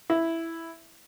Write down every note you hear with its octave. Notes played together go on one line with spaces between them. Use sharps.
E4